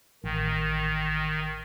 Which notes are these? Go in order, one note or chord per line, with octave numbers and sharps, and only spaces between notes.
A1 D#3